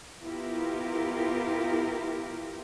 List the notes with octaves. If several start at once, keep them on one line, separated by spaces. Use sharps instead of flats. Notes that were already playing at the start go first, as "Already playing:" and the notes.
B3 E4 F4 G4 A#4